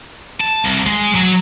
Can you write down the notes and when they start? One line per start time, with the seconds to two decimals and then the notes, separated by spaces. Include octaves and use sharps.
0.40 A5
0.64 C2
0.86 G#3
1.15 F#3